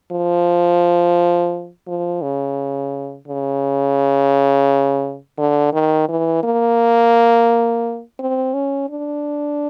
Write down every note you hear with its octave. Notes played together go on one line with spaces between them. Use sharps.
F3
F3
C#3
C#3
D3
D#3
E3
A#3
C4
C#4
D4